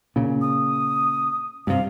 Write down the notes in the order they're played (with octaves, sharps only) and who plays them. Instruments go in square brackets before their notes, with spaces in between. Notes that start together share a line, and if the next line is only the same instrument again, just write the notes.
[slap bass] A#2 C#3
[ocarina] D#6
[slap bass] G2 C3 [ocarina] F5